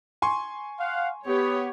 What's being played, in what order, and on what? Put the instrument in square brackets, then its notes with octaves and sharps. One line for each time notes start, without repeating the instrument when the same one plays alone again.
[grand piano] G#5 C6 C#6
[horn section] F5 F#5
[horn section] B3 [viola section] G4 C#5